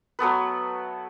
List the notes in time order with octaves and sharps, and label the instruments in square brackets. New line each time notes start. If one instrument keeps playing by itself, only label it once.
[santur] F#3 A3 B3 B4